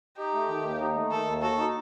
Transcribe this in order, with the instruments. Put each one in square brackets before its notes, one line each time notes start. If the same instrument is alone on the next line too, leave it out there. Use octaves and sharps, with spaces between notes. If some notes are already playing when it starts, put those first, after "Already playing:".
[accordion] D#4 [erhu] G4
[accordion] A3
D#3
D#2
D#4
A3
[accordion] D#3 [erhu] A4
[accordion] D#2
[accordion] F#4 [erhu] A4
[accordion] D#4